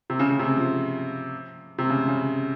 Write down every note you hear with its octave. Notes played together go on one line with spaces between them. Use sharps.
C3
C#3
C#3
C3
F3
C3
C#3
C#3